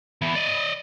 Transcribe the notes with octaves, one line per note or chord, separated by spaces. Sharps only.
E3 B3
D5 D#5